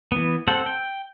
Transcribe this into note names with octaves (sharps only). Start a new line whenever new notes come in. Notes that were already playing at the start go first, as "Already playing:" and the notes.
E3 B3
C4 A4 C5 F#5
G5